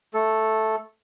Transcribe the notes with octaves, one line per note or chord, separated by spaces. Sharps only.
A3 A4